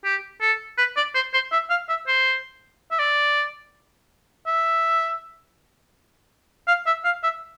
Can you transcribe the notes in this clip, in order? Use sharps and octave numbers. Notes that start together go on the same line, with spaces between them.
G4
A4
B4
D5
C5
C5
E5
F5
E5
C5
E5
D5
E5
F5
E5
F5
E5